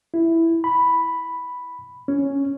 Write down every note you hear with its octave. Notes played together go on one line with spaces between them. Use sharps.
E4
B5
C#4